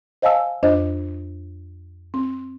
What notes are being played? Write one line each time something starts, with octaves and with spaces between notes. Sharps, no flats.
C5 D#5 F5 G#5 A5 E6
F2 D4 C5 D#5
C4